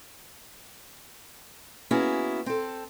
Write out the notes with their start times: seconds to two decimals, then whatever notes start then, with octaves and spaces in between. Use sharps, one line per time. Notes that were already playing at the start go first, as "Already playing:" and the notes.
1.91 A#3 B3 C#4 E4 F#4 G#4
2.46 C4 A4